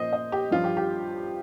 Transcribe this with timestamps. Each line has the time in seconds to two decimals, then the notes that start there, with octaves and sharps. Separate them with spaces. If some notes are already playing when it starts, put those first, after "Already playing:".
Already playing: A#2 F3 C5 D#5
0.13 D#5
0.32 G4
0.51 G2 F3 F4
0.64 G4
0.77 G4